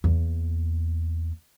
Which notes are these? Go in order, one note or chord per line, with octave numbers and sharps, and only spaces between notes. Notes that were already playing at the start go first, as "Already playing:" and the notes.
E2 A#3